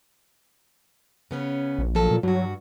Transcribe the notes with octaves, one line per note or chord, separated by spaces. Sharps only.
C#3 B3 C#4
A#1
F3 F#3 A4
A#2
G2 F#3 F#4